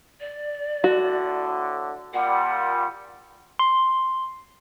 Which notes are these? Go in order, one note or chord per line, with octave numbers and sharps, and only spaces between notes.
D5
A2 D3 F#4
A#2 G3 F#5
C6